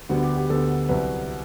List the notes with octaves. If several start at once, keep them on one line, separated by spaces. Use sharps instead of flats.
D2 D3 G3 B3 F#4
G4
G4
D2 D3 G3 B3 A4
C2 C3 F#3 B4